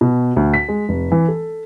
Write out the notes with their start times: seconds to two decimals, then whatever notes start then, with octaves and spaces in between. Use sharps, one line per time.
0.01 B2
0.36 D2
0.54 B6
0.69 G#3
0.89 F1
1.12 E3
1.28 A4